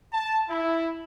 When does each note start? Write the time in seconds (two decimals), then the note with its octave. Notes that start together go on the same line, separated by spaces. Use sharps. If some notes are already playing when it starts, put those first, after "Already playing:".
0.13 A5
0.49 E4